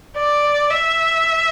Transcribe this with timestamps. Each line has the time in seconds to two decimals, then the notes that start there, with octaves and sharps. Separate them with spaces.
0.16 D5
0.70 E5